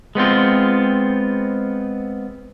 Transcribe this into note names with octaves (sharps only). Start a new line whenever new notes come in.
G#3 B3 C4 F4